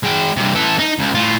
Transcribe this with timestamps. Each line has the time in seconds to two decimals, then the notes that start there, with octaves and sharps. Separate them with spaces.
0.03 G#3 G5
0.36 G2 C3
0.54 E3 A4
0.79 D#4
0.99 C#2
1.15 A2 F4